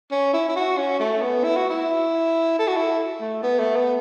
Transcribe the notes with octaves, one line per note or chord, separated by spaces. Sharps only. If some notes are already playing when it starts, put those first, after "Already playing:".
C#4
E4
E4
F#4
C#4
A3
B3
E4
F#4
E4
A4
F#4
E4
A3
B3
A3
B3